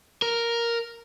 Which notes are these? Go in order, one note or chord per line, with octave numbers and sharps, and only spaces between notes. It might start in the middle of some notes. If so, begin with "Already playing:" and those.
A#4